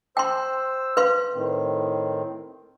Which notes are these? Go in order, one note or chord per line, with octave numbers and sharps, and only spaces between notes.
C5 G5 C6 E6
B4 F5 C6
A2 D#3 C4